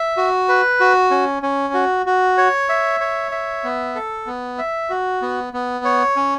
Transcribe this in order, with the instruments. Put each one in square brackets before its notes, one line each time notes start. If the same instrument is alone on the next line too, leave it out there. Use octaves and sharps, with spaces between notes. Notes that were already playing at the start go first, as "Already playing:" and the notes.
Already playing: [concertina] E5
F#4
B4
F#4
C#4
C#4
F#4
F#4
C#5
E5
C#5
E5
B3
A4
B3
E5
F#4
B3
B3
C#5
C#4